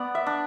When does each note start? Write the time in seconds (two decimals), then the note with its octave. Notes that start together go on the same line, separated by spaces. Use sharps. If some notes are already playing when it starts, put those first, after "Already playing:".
Already playing: B3 D5
0.15 E5
0.26 D4